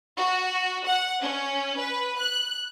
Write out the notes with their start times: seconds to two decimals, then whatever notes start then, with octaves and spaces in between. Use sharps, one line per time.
0.18 F#4
0.87 F#5
1.22 C#4
1.78 B4
2.19 F#6